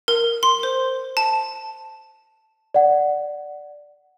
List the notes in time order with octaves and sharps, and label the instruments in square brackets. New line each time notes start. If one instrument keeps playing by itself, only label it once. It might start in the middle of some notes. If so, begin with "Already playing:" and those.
[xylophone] A#4
C6
C5
A5
[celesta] D5 F#5